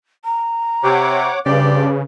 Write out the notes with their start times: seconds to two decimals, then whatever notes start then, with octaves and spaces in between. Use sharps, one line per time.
0.25 A#5
0.84 C3 C#5 F#5 D6
1.46 G2 C#3 G4 B4 C5 D5